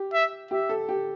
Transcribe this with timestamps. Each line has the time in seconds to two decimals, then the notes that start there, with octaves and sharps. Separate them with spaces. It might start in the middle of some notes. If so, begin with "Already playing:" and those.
Already playing: G4
0.14 E5
0.51 G4 E5
0.69 A4
0.89 G4